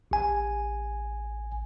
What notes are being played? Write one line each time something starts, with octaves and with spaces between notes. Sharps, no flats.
A1 G#5